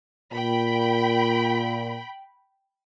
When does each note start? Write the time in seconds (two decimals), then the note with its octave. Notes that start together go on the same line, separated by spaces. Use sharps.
0.33 A#2 G5 B5